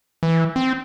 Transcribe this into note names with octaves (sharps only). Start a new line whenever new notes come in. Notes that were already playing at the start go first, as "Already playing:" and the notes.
E3
C4